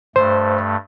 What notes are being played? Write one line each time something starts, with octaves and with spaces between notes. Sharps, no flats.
G2 A3 C5